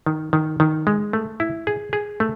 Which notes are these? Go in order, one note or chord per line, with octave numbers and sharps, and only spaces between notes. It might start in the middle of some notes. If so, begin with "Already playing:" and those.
D#3
D#3
D#3
G#3
A3
E4
G#4
G#4
A3